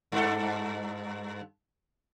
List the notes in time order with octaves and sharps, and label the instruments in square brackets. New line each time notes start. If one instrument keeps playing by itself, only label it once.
[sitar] G2 A4